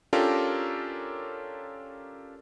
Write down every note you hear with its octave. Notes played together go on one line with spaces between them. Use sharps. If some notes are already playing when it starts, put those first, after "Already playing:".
C#4 D4 F4 G4 A4 A#4